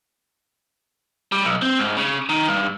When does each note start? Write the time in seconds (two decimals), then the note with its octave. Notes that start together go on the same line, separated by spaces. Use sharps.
1.32 G3
1.45 B1
1.62 C4
1.79 G#2
1.97 C#3
2.29 D#3
2.48 G2